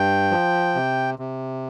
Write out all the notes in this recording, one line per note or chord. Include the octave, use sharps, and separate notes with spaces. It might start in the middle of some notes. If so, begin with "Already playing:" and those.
Already playing: G2 G5
F3
C3
C3